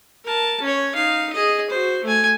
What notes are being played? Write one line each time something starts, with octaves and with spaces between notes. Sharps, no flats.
A#4 A5
C#4 C#5
D#4 F5
G#4 D#5
F#4 C5
A3 G#5